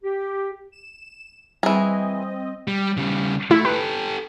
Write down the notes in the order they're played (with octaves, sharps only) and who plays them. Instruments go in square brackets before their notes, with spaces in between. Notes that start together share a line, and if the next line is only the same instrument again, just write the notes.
[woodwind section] G4
[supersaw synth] E7
[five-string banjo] E3 G#4 [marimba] G3 [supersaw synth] C4 D#5
[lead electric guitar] G3
C#3 G3
[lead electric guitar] A3 [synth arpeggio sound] E4
[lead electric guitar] G4 A4 [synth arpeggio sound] B4